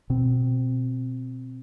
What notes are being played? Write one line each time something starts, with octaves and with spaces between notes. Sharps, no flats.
B2 C4